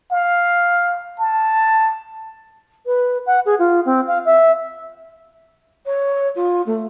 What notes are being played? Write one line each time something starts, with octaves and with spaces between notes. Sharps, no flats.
F5
A5
B4
F#5
G#4
F4
C4
F5
E5
C#5
F4
A3